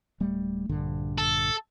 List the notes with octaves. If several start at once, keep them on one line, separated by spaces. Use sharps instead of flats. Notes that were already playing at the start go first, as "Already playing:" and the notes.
D1 G3 A3
A#1 G2 D3
A4